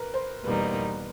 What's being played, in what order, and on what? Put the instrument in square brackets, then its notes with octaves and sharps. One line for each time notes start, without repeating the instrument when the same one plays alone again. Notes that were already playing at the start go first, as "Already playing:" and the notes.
Already playing: [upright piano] A#4 B4
C5
[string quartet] E2 B2 G3 A#3 D#4 [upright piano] B4